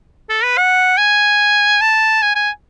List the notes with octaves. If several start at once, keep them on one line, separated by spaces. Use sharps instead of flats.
A4
B4
F#5
G#5
A5
G#5
G#5